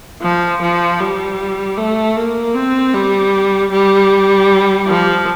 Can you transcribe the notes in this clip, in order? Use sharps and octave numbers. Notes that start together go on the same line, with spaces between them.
F3
F3
G3
A3
A#3
C4
G3
G3
F3